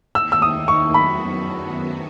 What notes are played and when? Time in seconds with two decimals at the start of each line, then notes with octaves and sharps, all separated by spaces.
0.15 D#2 D#3 A#3 D#4 E6
0.32 E6
0.42 D#6
0.68 C#6
0.94 F#2 D#3 F#3 B3 F#4 B5